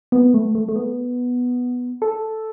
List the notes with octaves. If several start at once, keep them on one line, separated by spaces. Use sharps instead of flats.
B3
A3
A3
A3
B3
A4